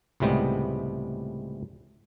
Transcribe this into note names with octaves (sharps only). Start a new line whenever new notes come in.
C#2 A2 C3 G3 G#3 B3